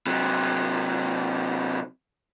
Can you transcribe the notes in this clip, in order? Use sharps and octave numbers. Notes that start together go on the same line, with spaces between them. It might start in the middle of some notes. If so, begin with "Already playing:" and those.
C3 F#3